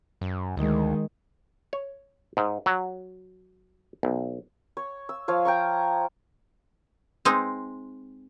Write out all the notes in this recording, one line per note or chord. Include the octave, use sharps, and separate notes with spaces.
F#2
D2 D#3 G#3
C#5
G#2
F#3
B1
C#5
E6
F3 C#5 F5
G5 A#5 C#6
G#3 C4 D#4